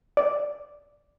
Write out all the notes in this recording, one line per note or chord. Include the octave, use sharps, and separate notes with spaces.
D5